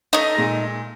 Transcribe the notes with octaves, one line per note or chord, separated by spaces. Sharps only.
A3 D#4 D#5
A#2 G#3 A#6